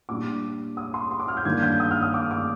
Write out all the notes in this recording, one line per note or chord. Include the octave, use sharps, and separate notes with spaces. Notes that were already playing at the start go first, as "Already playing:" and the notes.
A#2 G3 D4 D6
D#6
C6
C6
D6
F6
G6
G2 D#3 A#3 D4 G#6
G6
D#6
F6
D#6
D6
D6